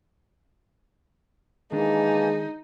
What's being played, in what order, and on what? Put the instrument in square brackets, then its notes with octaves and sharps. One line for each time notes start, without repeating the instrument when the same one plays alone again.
[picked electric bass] D#3 D4 [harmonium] E3 A#3 A5 [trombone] G#3 [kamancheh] D#4